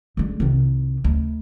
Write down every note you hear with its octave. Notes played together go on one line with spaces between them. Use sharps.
D3 G#3
C2 D#3
D2